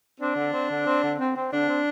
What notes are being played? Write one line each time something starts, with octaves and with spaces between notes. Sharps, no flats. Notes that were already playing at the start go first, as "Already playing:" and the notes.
C4 D4
D3
C4
D3
C4
D3
C4
C4
D3 D4
C4